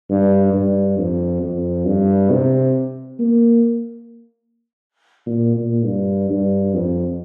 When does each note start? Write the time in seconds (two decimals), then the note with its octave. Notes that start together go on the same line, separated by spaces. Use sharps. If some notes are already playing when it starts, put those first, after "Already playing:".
0.10 G2
0.54 G2
0.98 F2
1.42 F2
1.86 G2
2.31 C3
3.19 A#3
5.26 A#2
5.56 A#2
5.85 G2
6.30 G2
6.74 F2